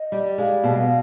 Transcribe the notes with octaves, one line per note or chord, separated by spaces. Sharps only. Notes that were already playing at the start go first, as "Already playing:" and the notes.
Already playing: D#5
G3
G#3 F5
B2